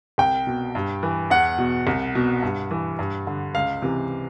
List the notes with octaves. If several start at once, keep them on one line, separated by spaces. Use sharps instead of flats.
C2 G5
B2
G2
E3
E2 F#5
B2
C2
B2
G2
E3
G2
D3
C#2 F5
C3 E3